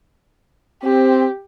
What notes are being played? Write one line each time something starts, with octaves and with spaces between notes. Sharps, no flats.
C4 G4